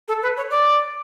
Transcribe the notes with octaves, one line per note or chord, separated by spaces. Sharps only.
A4
B4
C#5
D5